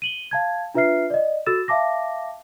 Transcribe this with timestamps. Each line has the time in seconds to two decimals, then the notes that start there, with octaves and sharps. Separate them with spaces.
0.02 D#7 F#7 G7
0.31 F5 A5 G#6
0.74 D4 F4 B4 E5 F6 C7
1.10 D5 D#5
1.46 F#4 A4 E6 A6 E7
1.68 E5 F5 A5 D6 A#6